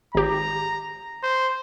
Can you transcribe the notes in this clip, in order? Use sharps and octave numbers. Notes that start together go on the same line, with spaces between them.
G#1 G4 A#5
C5